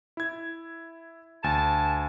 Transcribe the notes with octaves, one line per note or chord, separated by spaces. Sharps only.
E4 G#6
D2 G#5 A5